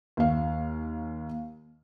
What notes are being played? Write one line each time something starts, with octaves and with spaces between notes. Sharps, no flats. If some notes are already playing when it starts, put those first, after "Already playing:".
D#2 F5